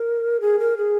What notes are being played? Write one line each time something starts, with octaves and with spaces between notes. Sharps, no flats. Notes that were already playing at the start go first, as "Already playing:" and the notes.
Already playing: A#4
G#4
A#4
G#4